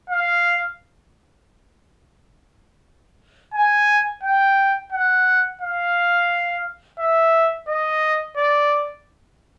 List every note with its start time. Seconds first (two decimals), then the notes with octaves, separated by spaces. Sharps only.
0.10 F5
3.54 G#5
4.23 G5
4.93 F#5
5.62 F5
6.99 E5
7.68 D#5
8.37 D5